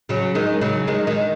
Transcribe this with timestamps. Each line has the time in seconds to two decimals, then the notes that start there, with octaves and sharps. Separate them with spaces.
0.09 C#3 F#3
0.35 D#3 G#3
0.61 C#3 F#3
0.87 D#3 G#3
1.07 D#3 G#3